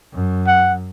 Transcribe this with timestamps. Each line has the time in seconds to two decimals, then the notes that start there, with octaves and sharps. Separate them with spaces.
0.14 F#2
0.47 F#5